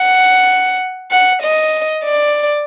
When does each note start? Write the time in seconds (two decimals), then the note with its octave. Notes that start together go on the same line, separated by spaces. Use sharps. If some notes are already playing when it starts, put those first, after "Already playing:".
Already playing: F#5
1.11 F#5
1.43 D#5
2.04 D5